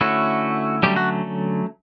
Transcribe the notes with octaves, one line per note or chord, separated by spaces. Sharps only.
D3 A3 C#4 E4 F#4
D3 F#3 G3 A3 C#4 G4
F#4